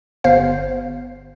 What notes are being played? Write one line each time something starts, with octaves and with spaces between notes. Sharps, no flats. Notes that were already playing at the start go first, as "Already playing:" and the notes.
G1 B3 C5 F5